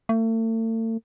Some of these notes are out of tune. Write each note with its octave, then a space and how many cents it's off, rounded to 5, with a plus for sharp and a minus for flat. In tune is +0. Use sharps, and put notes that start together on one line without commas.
A3 +40